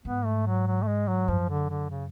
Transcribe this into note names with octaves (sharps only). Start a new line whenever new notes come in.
G#2 B3
A3
F#3
F#3
A3
G#3
F#3
F#2 F3
D3
D3
C#3